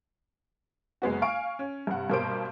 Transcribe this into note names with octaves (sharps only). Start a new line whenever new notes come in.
F#1 G#3 B3 F#4
F5 G#5 C#6 D7
C#4
G2 C3 F#5
G2 B2 A#3 G4 C5 D7